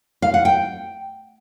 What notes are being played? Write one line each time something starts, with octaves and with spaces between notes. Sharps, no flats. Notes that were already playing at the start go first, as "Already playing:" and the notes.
F5
F#5
G5